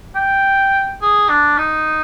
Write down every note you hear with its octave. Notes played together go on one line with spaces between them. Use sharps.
G5
G#4
D4
D#4